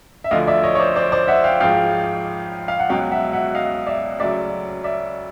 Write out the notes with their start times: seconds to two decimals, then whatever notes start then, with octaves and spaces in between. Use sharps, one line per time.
0.24 E5
0.31 D2 D3 F3 D#5 F5
0.47 D5 E5
0.63 C#5 D#5
0.75 C#5
0.80 C5 D5
0.96 C5 D5
1.12 C5 D5
1.28 E5 F#5
1.44 F5 G5
1.60 G#1 G#2 F3 G#3 F5 G5
2.68 F5
2.80 F#5
2.89 C#2 B2 F#3 F5 G5
3.11 E5 F#5
3.33 E5 F#5
3.55 D#5 F5
3.87 D5 E5
4.19 D2 C#3 F#3 D5 E5
4.84 D5 E5